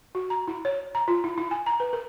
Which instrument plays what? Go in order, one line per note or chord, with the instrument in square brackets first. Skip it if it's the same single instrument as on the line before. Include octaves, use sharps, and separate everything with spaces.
[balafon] F#4
A#5
E4
C#5
A#5
F4
E4
E4
G#5
A#5
B4
A#4